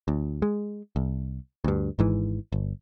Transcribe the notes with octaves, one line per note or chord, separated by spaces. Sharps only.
D2
G#3
C2
D2 G2
G#1 G#2 E3
G1